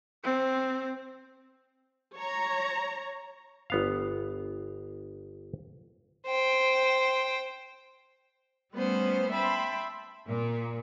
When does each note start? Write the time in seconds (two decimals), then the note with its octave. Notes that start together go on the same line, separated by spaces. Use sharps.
0.24 C4
2.15 C#5 A#5
3.70 G1 B3 F5
6.27 C5 G5
8.73 G3 A3 B3 C#4 B4 C5
9.31 E5 G5 A5 B5 C6
10.27 A#2